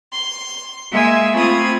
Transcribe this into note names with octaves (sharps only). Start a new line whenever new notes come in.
C6
G#3 A#3 E5 G#5
A3 C4 F4 B5 D#6 G#6